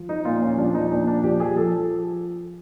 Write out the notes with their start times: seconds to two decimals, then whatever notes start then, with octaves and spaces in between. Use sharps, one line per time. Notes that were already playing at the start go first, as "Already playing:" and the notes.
Already playing: F3
0.09 D#4
0.25 A#2 F4
0.42 C#4
0.58 F3 D4
0.74 D#4
0.91 A#2 D4
1.07 D4
1.24 F3 G4
1.40 G#4
1.56 F3 A4